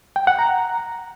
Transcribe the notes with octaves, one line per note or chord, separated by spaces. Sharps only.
G5
F#5
A#5